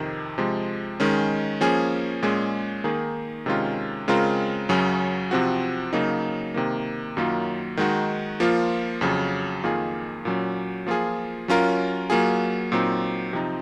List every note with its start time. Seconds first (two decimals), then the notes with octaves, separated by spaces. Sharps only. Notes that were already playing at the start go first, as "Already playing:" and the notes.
Already playing: F2 C3 D#3
0.38 C3 F3 G#3
1.00 D#3 G#3 C#4
1.61 F3 A#3 C#4 G#4
2.22 A#2 G#3 C#4 G#4
2.84 D#3 A#3 D#4 G#4
3.46 C3 D#3 G#3 C#4 F4
4.08 C#3 G#3 C4 F4 A#4
4.69 F#2 C#3 F#3 C#4
5.31 C3 F3 C4 F#4
5.93 C#3 F#3 A#3 D#4
6.54 C3 D#3 A#3
7.17 F#2 D#3 F#3 A#3 F4
7.77 D#3 G#3 D#4 F#4
8.40 F3 A#3 F4
9.01 F2 C#3 F#3
9.63 F2 D#3 A#3 F4 G#4
10.25 A#2 F#3 C#4
10.87 F3 A#3 F4 G#4
11.48 F#3 C#4 F4 A#4
12.10 F#3 A#3 F4 G#4
12.72 A#2 F#3 C4 D#4
13.33 C3 F3 C4 D#4